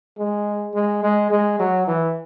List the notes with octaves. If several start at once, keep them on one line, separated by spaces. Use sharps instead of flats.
G#3
G#3
G#3
G#3
F#3
E3